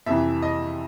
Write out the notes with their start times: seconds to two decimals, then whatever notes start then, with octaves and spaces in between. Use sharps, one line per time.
0.06 F2 C3 E3 E5
0.42 D#5